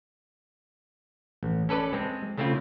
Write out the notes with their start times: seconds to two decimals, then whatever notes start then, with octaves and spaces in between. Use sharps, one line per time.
1.43 A1
1.69 C#4 A4 B4 D5 A5
1.93 G#3 C4
2.38 C#3 A3 C4 E4 F4